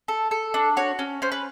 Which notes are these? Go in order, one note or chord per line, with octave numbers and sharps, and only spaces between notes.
A4
A4
D4
F#4 C#5
C#4
C#4 C5
B4